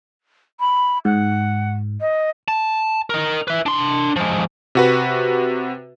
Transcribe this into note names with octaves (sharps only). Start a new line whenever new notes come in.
B5
G#2 F#5
D#5
A5
A#4 D#5
B4 E5
D4 C6
F3 G#3
C3 F#4 B4